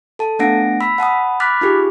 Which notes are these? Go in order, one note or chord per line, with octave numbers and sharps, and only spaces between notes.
A4 A5
A3 B3 D4 F#5 A#6 D7
B5 E6 B6
F#5 A5 B5 D#6
B5 D6 F6 F#6 A6 B6
D#4 F4 G4 G#4